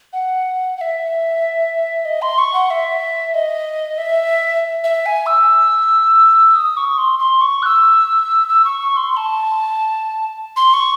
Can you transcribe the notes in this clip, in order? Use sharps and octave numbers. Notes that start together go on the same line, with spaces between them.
F#5
F#5
E5
D#5
C6
C#6
F#5
E5
D#5
E5
E5
G#5
E6
D#6
C#6
C6
C6
C#6
F#6
E6
E6
C#6
C#6
C6
C6
A5
C6
C#6